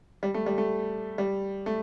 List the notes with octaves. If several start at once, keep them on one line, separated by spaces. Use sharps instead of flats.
G3
A3
G3
A3
G3
A3